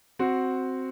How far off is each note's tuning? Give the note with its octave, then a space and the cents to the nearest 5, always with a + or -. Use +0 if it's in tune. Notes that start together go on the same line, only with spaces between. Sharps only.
C4 +0 F#4 +0